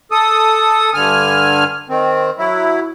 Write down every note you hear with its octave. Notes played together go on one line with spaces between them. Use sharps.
A4 D#6
G2 D3 G#5 F6
D#3 C4
F#3 E4